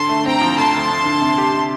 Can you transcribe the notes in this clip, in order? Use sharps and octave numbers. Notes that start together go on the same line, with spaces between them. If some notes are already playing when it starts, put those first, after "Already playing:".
Already playing: D3 A5 C6
A3
C4 G5 A#5
F3
D2 A5 C6
D2
D2
D3
C3
G4
C3